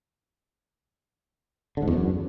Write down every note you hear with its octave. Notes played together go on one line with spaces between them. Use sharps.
D3
G#2
E2
F#2